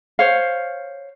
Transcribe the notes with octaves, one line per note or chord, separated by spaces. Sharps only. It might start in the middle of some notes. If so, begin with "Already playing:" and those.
C5 C#5 F5